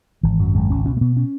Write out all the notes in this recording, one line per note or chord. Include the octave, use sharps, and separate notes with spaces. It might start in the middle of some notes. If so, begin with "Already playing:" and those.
G#1 E3
F#2 F#3
G#1 G#3
C#2 C#4
B2 C#4
A3
B2 B3
C#4